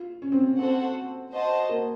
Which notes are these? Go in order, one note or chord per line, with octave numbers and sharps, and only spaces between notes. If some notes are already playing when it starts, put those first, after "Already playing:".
Already playing: F4
C#4
C4
C#4
C4 F#4 A4 C5 F#5
F#4 C5 D#5 A5
A#3